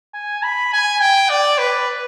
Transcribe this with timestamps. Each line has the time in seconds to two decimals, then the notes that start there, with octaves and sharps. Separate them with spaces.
0.14 G#5
0.43 B5
0.73 G#5
1.01 G5
1.30 D5
1.58 B4